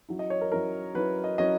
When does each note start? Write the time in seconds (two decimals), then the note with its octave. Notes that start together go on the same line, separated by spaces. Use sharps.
0.09 F#3 C#4 E4
0.19 D#5
0.30 C#5
0.41 A#4
0.52 F#3 C#4 E4 A#4
0.95 F#3 C#4 E4 B4
1.24 D#5
1.38 F#3 C#4 E4 D#5